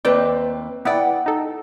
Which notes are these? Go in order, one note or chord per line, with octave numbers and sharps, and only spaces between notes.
D#2 C4 B4 D5 G5 D6
B3 E4 D5 F#5 G5
D#4 A4